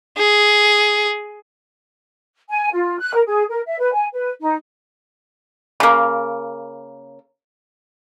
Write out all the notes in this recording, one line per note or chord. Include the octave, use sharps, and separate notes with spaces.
G#4
G#5
F4
F#6
A#4
G#4
A#4
E5
B4
G#5
B4
D#4
C#3 A#3